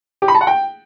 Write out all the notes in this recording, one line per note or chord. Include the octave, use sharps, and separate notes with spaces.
G4
B5
A5
F#5
G5